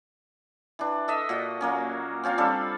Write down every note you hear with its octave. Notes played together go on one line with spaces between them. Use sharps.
E3 D4
A4 D#5 E5
A#2 F#4 D#5
F#3 A#3 C#4
C4 C#4 F4 F5
G3 C4 D4 A4